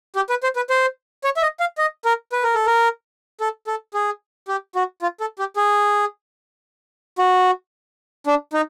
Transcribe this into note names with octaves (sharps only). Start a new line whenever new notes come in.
G4
B4
C5
B4
C5
C#5
E5
D#5
F5
D#5
A#4
B4
A#4
A4
A#4
A4
A4
G#4
G4
F#4
F4
A4
G4
G#4
F#4
D4
D#4